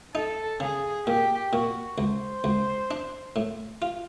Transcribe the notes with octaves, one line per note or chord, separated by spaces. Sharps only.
D#4 A4
C#3 G#4
A#2 G4
A#2 F#4
C#2 C5
C#2
D4
A2
F4